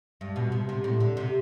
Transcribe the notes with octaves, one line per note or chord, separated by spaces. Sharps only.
G2
B2
C3
C3
A2
D3
C3